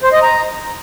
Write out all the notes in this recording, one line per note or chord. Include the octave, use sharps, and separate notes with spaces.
C5
D#5
A#5